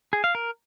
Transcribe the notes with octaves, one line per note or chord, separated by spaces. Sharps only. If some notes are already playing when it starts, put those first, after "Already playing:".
G#4
F5
A#4